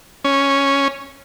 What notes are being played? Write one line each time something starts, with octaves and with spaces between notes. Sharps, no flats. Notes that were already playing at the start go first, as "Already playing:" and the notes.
C#4